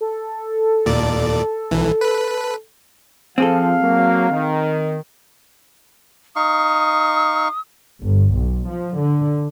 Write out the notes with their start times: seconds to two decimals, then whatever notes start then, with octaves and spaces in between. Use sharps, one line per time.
0.01 A4
0.86 D#2 A#2 D5
1.71 B1 E3
2.01 B4
3.38 F3 C4 G#4 A4 F5
3.81 F#3 A#3
4.30 D#3
6.36 D#4 F5 C#6 D#6
8.02 G1
8.36 B1
8.69 F3
9.00 D3